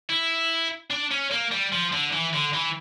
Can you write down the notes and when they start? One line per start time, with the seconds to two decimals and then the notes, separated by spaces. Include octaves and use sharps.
0.10 E4
0.91 D4
1.11 C#4
1.32 A#3
1.52 G3
1.73 F3
1.93 D3
2.13 E3
2.34 D3
2.54 E3